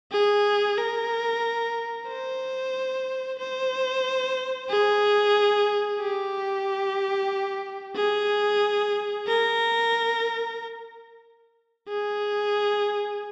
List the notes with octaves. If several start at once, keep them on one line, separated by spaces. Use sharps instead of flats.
G#4
A#4
C5
C5
G#4
G4
G#4
A#4
G#4